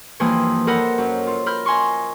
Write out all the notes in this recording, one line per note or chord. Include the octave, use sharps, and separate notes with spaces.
G2 E3 F3 A#3 C5 D#6
A4 A#4 C5 D#5 F#5 B5
F#2
F4
A#4 B5 F6 G6
D#5 G#5 C6 C#6